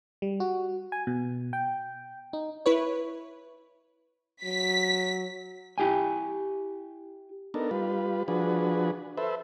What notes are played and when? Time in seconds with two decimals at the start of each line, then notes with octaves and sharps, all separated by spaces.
0.22 G3
0.40 F#4
0.92 G#5
1.07 B2
1.53 G5
2.33 D#4
2.66 E4 B4 C#5
4.45 F#3 B6
5.78 E4 G4 G5 G#5
7.54 B3 D4 D#4 A4 A#4
7.71 G3 F4 B4
8.28 F3 D4 F#4 G#4 B4
9.17 A4 B4 C5 E5